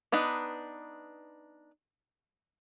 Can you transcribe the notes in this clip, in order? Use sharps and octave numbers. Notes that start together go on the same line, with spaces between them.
B3 D4 D#4 B4